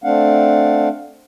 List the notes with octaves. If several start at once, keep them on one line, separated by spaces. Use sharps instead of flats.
A3 C4 D4 F5 F#5